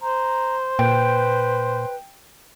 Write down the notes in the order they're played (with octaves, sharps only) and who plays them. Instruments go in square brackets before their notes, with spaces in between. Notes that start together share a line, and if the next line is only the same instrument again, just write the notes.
[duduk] C5 [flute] A#5
[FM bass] A#2 [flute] B4 [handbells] G5